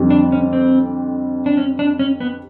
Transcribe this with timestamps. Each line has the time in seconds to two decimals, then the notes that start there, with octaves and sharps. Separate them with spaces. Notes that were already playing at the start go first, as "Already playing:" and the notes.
Already playing: F2 D3 G3
0.10 D4
0.32 C#4
0.53 C4
1.46 D4
1.57 C#4
1.79 D4
1.99 C#4
2.20 B3